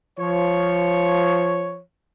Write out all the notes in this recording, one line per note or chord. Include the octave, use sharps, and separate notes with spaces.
F3 C#5